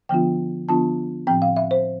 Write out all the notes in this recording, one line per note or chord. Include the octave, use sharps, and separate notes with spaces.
D3 F3 B3 D4 F4 G5
D3 F3 B3 D4 F4 A5
A2 F3 C4 G5
F5
E5
C5